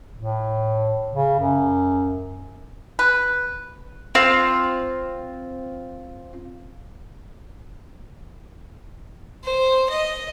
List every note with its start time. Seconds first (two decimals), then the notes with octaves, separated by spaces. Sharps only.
0.16 A2
1.14 C#3
1.40 F#2
2.99 B4
4.15 C4 F4
9.44 C5
9.90 D#5